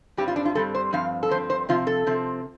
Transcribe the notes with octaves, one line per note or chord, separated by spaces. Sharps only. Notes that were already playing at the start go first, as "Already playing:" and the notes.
G2 G3 C4 G4
F4
D4
F4
G2 G3 C4 A4
C5
G2 F3 C4 F5
A4
G2 F3 C4 C5
C5
C3 F3 C4 F4
A4
C3 F3 C4